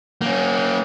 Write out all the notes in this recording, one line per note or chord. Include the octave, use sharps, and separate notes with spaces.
A#3 C#4